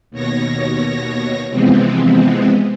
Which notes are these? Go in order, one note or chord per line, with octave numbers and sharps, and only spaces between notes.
D#2 B2 C#5 A#6
C3 E3 F3 G#3 B3 C4